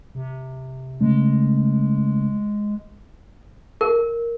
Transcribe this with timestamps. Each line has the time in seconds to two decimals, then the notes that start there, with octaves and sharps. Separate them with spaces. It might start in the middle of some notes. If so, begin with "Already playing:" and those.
0.15 C3
1.01 C#3 G#3 A3 C#4
3.81 A#4